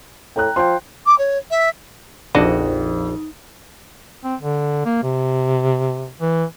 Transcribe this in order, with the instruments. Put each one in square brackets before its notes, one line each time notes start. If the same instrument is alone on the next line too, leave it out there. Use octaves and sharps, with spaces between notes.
[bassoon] A2 [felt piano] G5 A#5 F#6
[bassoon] F3 [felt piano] G5 C6
[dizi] D6
C#5
E5
[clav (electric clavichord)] A#1 F#4 D#5 [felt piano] F2 [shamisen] D4 D5 [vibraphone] D#4
[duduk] C4
D3
A#3
C3
E3